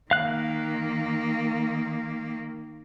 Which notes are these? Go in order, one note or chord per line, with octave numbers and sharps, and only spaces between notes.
D#3 A#3 F5 F#6